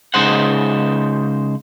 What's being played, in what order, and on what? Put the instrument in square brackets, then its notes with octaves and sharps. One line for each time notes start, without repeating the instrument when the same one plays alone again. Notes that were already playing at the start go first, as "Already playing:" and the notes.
[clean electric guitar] C#3 G#3 D#4 C5 F#5